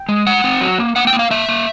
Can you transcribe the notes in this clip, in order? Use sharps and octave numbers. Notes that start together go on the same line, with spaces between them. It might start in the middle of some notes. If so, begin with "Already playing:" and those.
Already playing: G5
G#3
G#3 F#5
C4
F#3
A#3
A#3 F#5
G5
A#3
F5
A#3 E5
A#3